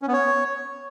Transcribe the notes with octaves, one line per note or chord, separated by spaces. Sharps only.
C#4
B3
C#5